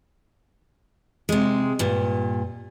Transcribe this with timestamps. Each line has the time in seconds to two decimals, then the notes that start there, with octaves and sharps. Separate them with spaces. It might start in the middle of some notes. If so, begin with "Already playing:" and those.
1.29 C3 G#3
1.79 G2 A#2